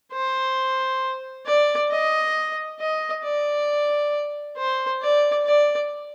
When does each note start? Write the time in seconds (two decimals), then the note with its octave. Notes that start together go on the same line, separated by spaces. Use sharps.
0.13 C5
1.46 D5
1.91 D#5
2.80 D#5
3.24 D5
4.57 C5
5.02 D5
5.45 D5